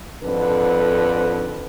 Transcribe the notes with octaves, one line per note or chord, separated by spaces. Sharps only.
F2 G#2 D3 B4